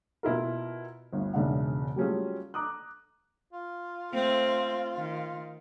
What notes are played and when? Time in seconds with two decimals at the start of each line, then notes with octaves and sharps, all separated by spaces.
0.23 B2 E4 F4 A#4
1.13 G1 D2
1.34 E1 G#2 C#3 D4 E5 F#5
1.96 F#3 G3 A3 C#4 F4 G#4
2.54 A#5 D6 D#6 F#6
3.53 F4
4.12 A3 C4
4.95 D#3